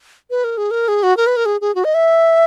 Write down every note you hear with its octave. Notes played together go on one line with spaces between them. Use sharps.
B4
A#4
G#4
A#4
G#4
F#4
A#4
B4
A#4
G#4
G#4
F#4
D#5
E5